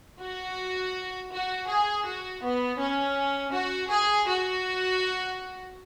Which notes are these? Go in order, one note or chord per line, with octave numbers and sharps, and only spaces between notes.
F#4
F#4
G#4
F#4
B3
C#4
F#4
G#4
F#4